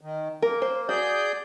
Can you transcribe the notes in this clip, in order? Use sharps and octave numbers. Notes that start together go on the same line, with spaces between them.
D#3
A#3 A#4
C5
F#4 G#4 D5 G6